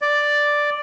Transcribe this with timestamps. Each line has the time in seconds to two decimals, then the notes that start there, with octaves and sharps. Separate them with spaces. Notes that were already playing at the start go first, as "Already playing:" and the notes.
0.02 D5